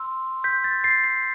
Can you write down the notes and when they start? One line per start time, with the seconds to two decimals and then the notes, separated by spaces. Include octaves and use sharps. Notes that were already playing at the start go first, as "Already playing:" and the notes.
Already playing: C6 E6
0.44 G6 B6
0.64 A6
0.84 A6 C7
1.04 A6 C7